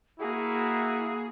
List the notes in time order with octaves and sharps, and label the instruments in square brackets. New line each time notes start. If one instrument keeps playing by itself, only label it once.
[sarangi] A#3 [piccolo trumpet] E4 [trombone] F#4 [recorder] G#4